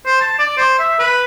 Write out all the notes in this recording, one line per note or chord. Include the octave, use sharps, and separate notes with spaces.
C5
A5
D5
C5
E5
B4